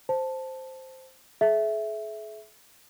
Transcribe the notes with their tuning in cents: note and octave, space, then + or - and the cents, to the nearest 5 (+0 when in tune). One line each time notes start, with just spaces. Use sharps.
C5 +0 A5 +0
G#4 +45 E5 +0